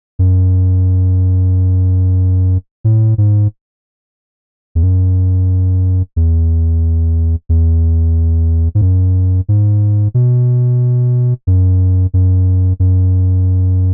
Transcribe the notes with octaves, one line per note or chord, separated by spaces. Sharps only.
F#2
A2
G#2
E2
F#2
E2
E2
G#2
F#2
G#2
B2
F#2
F#2
F#2